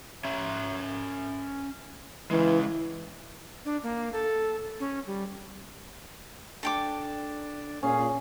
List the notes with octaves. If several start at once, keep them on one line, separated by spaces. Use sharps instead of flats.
C#4 E5
E3 G#3 C#4
D4
A#3
A4
C#4
G3
D4 A4 G5 D6
A#2 C#4 G#4 F5